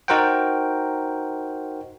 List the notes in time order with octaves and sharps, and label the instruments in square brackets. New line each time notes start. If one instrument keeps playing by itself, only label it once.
[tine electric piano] D#4 F#4 A#4 C5 F#5 G5